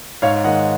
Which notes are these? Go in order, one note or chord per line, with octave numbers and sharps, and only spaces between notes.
G#2 C#5 F5
D#3 G#3 D#5 F#5